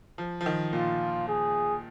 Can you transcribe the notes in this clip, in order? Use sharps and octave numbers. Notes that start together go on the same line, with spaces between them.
F3
F3
D#3
A#2 F4
G#4